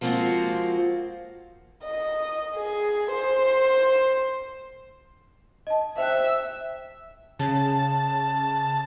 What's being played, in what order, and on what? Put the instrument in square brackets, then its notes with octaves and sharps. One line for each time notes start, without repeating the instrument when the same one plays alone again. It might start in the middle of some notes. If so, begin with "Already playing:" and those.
[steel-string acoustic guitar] F3 G#3 A#3 C4 F4 F#4
[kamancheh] D#5
G#4
C5
[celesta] D#5 A5
[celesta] C5 G5 F#6 [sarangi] E5
[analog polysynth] C#3 [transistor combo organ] A5